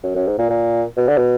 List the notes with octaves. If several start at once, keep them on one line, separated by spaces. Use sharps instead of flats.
F#2
F#2
G#2
A#2
A#2
B2
D3
B2